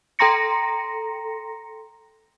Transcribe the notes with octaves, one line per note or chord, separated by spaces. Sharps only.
A4 G5 A#5 C6 A#6 C#7